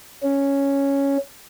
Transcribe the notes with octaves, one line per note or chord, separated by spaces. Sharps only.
C#4